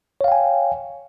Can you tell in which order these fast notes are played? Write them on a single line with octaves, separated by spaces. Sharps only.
C#5 F5 G5 G#5